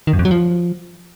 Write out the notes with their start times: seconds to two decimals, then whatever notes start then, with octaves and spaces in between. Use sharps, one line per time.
0.07 D#3
0.13 F#2
0.19 F2
0.25 F#3
0.31 F3